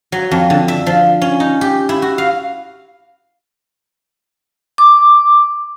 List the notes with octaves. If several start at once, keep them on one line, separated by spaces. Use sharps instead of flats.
F#3
F2
D3
E5
F3
C#4
D#4
G4
E4
F#4
F5
D6